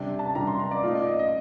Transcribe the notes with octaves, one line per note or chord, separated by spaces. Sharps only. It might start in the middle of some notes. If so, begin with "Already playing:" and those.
Already playing: C3 G3 D4
A5
A5
C3 G3 D4 A#5
C6
A#5
D5
A#2 A3 D#4 F4
D5
D#5
D#5